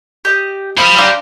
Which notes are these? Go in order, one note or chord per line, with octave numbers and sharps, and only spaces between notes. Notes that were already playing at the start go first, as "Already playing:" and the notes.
G4 D#5
F3 G4 E5 B5 F6
D4 C5 F5 A#5